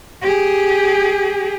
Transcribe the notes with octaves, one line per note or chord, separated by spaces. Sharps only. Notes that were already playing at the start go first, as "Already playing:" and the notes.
G4 G#4